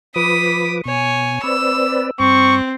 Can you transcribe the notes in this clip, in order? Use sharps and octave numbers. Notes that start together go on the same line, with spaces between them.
F3 B4 D6 D#6 B6
B2 C#5 G#5
C4 B4 D5 E6
G2 C4 C#6